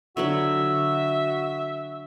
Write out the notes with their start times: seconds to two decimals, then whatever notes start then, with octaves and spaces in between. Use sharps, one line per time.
0.17 D3 F#3 F#4 E5 B5